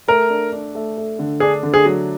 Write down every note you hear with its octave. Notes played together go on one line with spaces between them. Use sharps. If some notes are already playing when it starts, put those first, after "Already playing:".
A3 A#4
D4
D4
A3
A3
D3
D4 G#4
D3
G#4
F#3